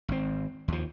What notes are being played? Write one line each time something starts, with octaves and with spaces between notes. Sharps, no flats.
G#1 C4
D#2 F3